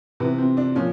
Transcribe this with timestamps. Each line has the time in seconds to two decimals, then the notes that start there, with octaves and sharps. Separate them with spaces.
0.20 C3 E3 B3
0.38 C4
0.57 D4
0.75 A#2 F3 C#4